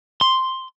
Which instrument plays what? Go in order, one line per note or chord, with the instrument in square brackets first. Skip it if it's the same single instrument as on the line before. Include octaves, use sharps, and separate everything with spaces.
[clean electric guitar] C6